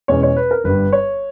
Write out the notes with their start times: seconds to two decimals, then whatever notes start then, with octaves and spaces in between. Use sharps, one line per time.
0.08 E2 B2 G#3 C#4 C#5
0.23 C#5
0.36 B4
0.51 A#4
0.64 G1 G2 G3 B4
0.93 C#5